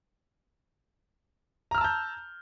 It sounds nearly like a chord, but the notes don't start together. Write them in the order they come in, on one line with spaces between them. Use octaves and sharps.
A#5 F6 E6 A5 G6